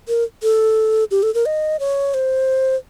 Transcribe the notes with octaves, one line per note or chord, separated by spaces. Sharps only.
A#4
A4
G4
A4
A#4
D#5
C#5
C5